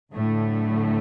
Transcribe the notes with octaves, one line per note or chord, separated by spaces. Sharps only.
D2 A2 D3 F#3 A3